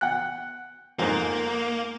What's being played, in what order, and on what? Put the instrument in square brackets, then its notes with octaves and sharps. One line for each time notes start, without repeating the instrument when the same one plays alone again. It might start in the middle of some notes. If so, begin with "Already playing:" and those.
[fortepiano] F#5 G5 F#6
[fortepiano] F2 G#2 [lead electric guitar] A#3